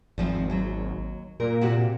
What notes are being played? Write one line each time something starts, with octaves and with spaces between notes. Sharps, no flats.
G#1 E2 F3 C4
D#2 F#3
A#2 A#4
C3 F#4 G4